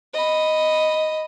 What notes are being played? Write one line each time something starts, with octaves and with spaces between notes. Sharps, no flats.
D#5 B5